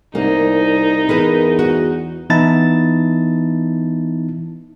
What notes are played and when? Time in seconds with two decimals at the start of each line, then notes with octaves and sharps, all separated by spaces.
0.15 C2 A#3 D#4
1.09 E2 E4 A#4 B4
1.59 F#4
2.30 E3 B3 D#4 E4 A5 A6